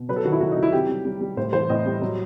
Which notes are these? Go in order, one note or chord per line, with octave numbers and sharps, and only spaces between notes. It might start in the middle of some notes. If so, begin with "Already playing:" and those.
Already playing: B2
F#3 B4
A4
D#3 F#4
E4
F#3 F#4
D#4
F#3
E4
C3 G4
G3
G3
G3
A2 C5
E3 C5
A2 D#5
G3
F#3